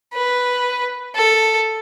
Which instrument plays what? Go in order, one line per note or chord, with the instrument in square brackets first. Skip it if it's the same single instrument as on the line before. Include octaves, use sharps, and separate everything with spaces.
[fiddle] B4
A4